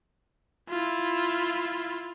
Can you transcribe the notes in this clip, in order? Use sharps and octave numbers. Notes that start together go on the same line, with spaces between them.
E4 F4